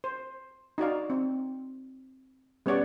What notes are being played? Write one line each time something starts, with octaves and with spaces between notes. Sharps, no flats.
C5
D#4 F#4 D5 F5
C4
G3 B3 C#4 C#5 D5 F#5